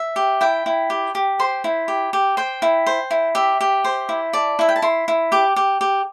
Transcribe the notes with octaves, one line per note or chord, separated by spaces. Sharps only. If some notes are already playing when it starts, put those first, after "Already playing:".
Already playing: E5
G4
E4 G5
E4
G4
G4
C5 C6
E4
G4
G4
C5 G5
E4
C5
E4
G4 E5
G4
C5
E4
D5 A5
E4 E5
G5
A5
E4 C6
E4
G4 D6
G4
G4